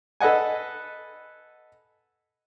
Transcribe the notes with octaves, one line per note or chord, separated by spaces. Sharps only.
A4 B4 D#5 F#5 G#5